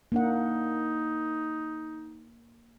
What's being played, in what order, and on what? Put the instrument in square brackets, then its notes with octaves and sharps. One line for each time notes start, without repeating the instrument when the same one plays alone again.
[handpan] A#3 D4 F#5 [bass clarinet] D#4